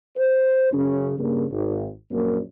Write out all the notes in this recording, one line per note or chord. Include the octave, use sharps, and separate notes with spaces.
C5
F#2 C#3 C#4
G2 C#3 A#3
G#1
A#1 F#2 A#3